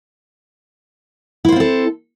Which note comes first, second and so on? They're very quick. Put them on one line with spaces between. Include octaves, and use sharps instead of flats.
E4 C5 F4 C4 A4